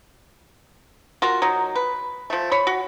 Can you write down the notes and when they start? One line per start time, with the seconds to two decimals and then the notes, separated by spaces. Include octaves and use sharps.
1.22 F4 F#4 A#4
1.42 F#3 D#4
1.76 B4
2.30 F3 A3
2.52 C#5 B5
2.67 F#4